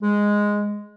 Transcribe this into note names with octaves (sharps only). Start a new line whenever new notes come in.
G#3